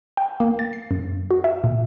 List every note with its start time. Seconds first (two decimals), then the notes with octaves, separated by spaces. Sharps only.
0.17 G5
0.40 A#3
0.59 A6
0.73 C7
0.91 F#2
1.31 F#4
1.44 E5
1.64 A#2